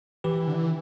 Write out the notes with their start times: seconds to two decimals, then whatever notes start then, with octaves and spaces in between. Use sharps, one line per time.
0.24 E3 G4 B4
0.40 E3
0.48 D3
0.54 E3